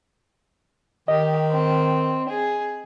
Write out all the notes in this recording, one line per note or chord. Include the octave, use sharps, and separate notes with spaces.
D#3 G4 D#5
C4
G#4